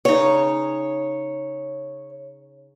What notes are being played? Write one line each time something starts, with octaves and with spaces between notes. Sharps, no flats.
C#3 D#4 C#5